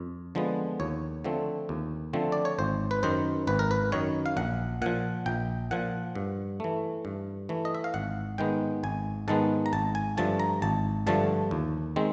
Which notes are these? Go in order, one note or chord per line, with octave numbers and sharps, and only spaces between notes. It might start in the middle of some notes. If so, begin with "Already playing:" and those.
Already playing: F2
D3 F3 G#3 B3
D#2 C#5
D3 F3 A3 C4
D#2
D3 F3 A3 C4
D5
C#5
G#1 C5
B4
F#2 D#3 C5
G#1 B4
A#4
B4
F#2 D#3 C#5
F5
A#1 F#5
A#2 F3 F#5
A#1 G5
A#2 F3 F#5
G2
E3 A3
G2
E3 A3
D#5
E5
F5
G#1 F#5
G#2 D#3 G#3 B3 G5
G#1 G#5
G#2 D#3 G#3 B3 A5
A#5
G#1 A5
G#5
G2 D3 F3 A3 A5
A#5
G#1 A5
G2 D3 F3 A3 A5
D#2
D#3 G#3 C4